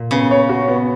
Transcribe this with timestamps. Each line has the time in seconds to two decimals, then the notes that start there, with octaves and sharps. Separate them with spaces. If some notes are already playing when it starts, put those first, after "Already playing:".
Already playing: A#2
0.11 C#3 B3
0.31 C#5
0.49 F#4
0.68 B3